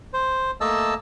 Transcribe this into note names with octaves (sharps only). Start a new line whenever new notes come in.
C5
A3 A#3 D#5 A5 E6